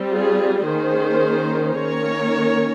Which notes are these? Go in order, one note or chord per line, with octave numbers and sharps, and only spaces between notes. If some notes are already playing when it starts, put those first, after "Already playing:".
Already playing: G3 C4
F4 G#4
D#3 A#3 C#4 G#4 C5
D#3 A#3 C#4 A#4 C#5